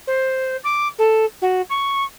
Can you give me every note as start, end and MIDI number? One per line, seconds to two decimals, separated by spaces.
0.07 0.56 72
0.63 0.87 86
0.98 1.25 69
1.41 1.61 66
1.69 2.04 85